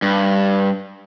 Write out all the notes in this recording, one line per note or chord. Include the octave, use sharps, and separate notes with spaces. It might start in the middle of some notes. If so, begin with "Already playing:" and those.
G2